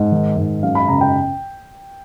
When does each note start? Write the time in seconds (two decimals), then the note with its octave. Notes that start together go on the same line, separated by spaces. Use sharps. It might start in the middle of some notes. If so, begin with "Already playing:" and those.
Already playing: G#2
0.12 D#3
0.37 G#2
0.63 F#2 F5
0.75 B5
0.88 C#3 A#5
1.01 G5